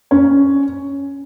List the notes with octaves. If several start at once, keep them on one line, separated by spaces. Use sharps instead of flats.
C#4